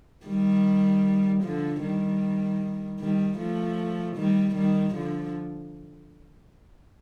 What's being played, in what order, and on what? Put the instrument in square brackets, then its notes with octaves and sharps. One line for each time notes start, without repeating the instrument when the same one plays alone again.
[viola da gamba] D#3 G3
D3 F3
D#3 G3
D#3 G3
F3 A3
D#3 G3
D#3 G3
D3 F3